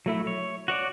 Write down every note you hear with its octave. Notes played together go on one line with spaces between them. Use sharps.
F#3 A3 E4
C#5
F#4 C#5 D5